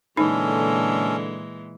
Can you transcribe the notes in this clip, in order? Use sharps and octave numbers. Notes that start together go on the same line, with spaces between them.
A#2 D3 E3 G#3 C#4 D#4 A4